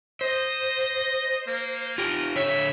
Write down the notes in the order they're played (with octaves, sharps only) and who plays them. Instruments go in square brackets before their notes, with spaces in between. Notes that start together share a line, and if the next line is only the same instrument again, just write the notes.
[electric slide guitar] C5 [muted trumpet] D#5
[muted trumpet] A#3
[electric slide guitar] F4 G4 [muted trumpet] A#4
[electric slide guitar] D3 C#5 [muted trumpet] E5